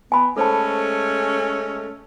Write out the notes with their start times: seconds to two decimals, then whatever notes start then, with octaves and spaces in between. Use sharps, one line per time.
0.12 B3 G#5 B5
0.37 G#3 A3 C#4 A4 C5 A5